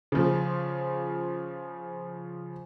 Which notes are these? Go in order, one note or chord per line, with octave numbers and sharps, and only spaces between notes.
C#3 F3